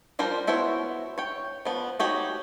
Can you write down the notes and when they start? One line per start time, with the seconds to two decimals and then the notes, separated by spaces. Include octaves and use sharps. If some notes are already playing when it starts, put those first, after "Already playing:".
0.19 F3 G3 F4 A#4 C5
0.47 B3 E4 F#4 C5 C#5
1.18 C#5 G5
1.65 F3 B3
1.99 D#4 F#4 G4 C#5